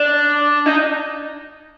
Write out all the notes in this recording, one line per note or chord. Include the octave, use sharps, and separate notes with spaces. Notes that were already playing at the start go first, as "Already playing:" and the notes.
Already playing: D4
D#4